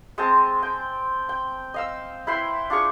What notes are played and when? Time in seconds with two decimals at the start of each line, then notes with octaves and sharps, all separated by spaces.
0.18 G#3 C4 A5
0.63 G5
1.29 G5
1.74 D#5 F5 E6
2.27 E4 B4 G5 C6
2.70 D4 F4 G#4 C#6